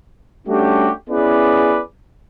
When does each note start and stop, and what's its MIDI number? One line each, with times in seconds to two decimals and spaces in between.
0.48 0.90 55
0.48 0.90 57
0.48 0.90 61
0.48 0.90 62
0.48 0.90 66
0.48 0.90 67
1.09 1.81 59
1.09 1.81 61
1.09 1.81 64
1.09 1.81 68
1.09 1.81 71
1.09 1.81 74